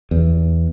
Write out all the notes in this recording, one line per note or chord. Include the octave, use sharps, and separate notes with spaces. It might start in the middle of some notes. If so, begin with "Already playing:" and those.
E2